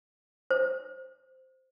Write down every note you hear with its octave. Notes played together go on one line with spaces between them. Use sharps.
C5